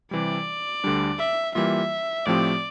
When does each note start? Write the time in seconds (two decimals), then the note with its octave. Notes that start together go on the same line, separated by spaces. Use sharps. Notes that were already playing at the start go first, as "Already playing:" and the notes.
0.11 C3 E3 G3 D5
0.84 D2 D3 G3 D4
1.19 E5
1.55 E3 G3 A#3 F4 E5
2.26 A2 F3 A3 C4 G4 D5